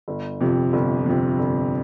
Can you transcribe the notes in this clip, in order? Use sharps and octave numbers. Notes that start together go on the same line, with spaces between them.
G1
F2 C3
G1
F2 C3
G1